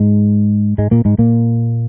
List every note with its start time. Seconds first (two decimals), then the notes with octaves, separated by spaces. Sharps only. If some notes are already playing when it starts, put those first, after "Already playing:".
Already playing: G#2 G#3
0.78 G#2 G#3
0.91 A#2 A#3
1.05 G#2 G#3
1.18 A#2 A#3